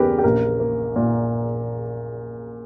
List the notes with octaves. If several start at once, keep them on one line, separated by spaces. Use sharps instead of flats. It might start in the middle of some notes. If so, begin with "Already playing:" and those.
Already playing: E2 C#3 G4 A#4 B4
G4
A#1 A#4
A#3
A#2